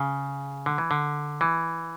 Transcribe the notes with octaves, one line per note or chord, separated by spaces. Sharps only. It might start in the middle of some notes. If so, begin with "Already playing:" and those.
Already playing: C#3
D3
E3
D3
E3